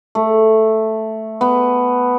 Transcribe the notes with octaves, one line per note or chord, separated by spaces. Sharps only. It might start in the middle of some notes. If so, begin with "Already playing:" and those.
A3
B3